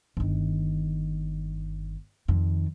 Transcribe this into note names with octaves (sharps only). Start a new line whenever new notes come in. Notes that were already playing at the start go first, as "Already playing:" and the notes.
G1 D#3
F2 D#3